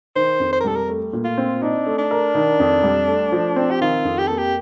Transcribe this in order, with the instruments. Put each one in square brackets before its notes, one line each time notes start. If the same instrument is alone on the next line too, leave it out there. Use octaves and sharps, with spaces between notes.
[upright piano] D#3 [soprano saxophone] C5
[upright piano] F2
[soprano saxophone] C5
A#4
[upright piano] G3 [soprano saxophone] A4
[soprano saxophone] A#4
[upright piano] A3
A#2
[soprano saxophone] F4
[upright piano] C4
[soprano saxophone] D4 [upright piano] D#4
[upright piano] A3
[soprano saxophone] D4
[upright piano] A#4
D#3
F2
G3
A3
F3
C4
[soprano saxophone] G4
[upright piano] D#3 [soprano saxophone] F4
[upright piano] F2
[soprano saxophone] G4
[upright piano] A#3 [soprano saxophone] A4
[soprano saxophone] G4